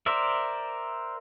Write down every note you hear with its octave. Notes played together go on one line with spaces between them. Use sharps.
A#4 C5 D5 E5